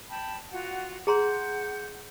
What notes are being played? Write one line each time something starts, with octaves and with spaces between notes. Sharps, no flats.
G5 A5 B5
F4 F#4 F#5
G#4 F#5 A#5 C6 G6